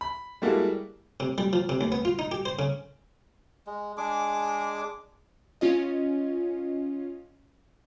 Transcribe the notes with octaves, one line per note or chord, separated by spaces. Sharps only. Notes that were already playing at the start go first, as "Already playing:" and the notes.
B5
G3 G#3 A#3 E4 F#4 A4
C3
G3
F3
C3
D#2
B3
F4
D#4
G4
C5
C#3
G#3
G#3 D4 G#4 D6
C#4 F4 D#5